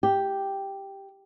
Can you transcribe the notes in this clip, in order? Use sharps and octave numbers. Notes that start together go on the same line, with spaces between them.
G4